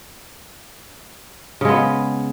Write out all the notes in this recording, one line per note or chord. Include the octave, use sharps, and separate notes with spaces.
C#3 G#3 B3